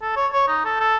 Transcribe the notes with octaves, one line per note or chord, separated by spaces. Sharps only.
A4
C#5
C#5
D#4
A4
A4